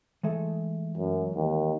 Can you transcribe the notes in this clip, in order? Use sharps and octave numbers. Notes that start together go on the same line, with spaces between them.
E3 G#3 A3
F#2
D#2